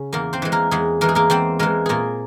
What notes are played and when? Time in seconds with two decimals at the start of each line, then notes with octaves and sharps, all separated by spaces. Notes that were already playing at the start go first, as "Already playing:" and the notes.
Already playing: C#3 C#4
0.13 E2 A#3 A#4
0.33 C4 C5
0.42 E3 G#3
0.52 A#3 A#4
0.71 E2 G#3 G#4
1.01 E3 G#3 A#4
1.09 G#4
1.15 A#3 A#4
1.30 E2 C4 C5
1.59 E3 G#3 A#3 A#4
1.86 A#2 A#3 G#4 A#4